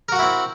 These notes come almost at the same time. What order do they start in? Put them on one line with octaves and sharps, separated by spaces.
A#4 F#4 F#5 E4 C4